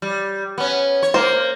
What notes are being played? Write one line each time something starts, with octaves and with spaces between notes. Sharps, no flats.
G3
B3 C#4
C#5
A#3 C5